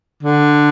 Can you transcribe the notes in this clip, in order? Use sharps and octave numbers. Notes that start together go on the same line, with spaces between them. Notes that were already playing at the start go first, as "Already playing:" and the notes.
D3